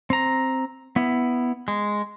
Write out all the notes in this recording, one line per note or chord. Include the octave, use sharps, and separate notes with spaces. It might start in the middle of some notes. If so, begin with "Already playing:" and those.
C4 A#5
B3 E4
G#3